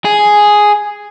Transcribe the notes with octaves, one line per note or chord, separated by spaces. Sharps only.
G#4